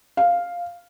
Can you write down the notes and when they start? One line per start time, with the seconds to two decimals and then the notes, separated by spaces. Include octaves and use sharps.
0.17 F5